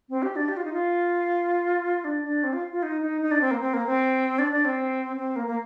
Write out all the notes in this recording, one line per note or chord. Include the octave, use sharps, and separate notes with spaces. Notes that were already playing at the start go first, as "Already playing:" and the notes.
C4
G4
D4
G4
F4
D#4
F4
D4
D4
C4
F4
F4
D#4
D#4
D#4
D4
C4
A#3
C4
A#3
C4
D4
D4
C4
C4
A#3
A#3